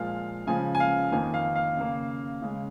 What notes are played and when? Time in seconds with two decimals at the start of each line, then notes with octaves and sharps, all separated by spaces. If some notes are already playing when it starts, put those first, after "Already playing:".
Already playing: A#2 F3 G#3 F5
0.47 C#3 F3 G#3 G#5
0.75 G#5
0.80 F5
1.12 F2 D#3 A#3 G#5
1.34 F5
1.56 F5
1.77 C#3 A#3
2.42 C#3 G#3